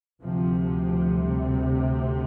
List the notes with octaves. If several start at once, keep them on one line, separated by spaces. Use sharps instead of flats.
D2 C3 F3
F3
G3